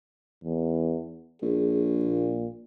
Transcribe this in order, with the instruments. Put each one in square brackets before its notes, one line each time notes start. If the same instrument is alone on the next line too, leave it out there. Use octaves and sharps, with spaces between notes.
[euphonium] E2
[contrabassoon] A#1 [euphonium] G#4
[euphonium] A#2